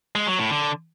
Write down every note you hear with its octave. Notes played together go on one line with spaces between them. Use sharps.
G#3
F#3
A2
D3